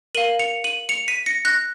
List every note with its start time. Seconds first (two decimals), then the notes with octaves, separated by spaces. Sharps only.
0.15 A#4 F5 D#7 F#7
0.39 C#7 F7
0.64 D#7 F#7
0.89 C#7 F7
1.08 B6 D#7
1.26 A#6 C#7
1.45 F#6 A#6